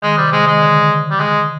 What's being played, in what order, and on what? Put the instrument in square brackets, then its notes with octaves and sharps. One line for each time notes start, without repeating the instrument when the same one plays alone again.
[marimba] D#3 [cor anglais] G#3
[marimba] C3 [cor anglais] G3
[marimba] C3 [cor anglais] G#3
[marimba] D#3 [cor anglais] G#3
[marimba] D3
[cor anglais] G3
G#3